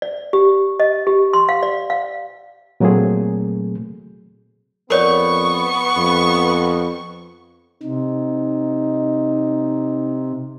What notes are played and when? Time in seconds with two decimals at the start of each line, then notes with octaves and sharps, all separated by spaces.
0.02 D5
0.33 G4
0.80 D#5
1.07 G4
1.33 C6
1.49 F5
1.63 D5
1.90 F5
2.80 A#2 F#3 A3 A#3 C4 G#4
4.90 F2 B3 A#4 C#5 D5 C#6
5.96 F2
7.83 C3 D#4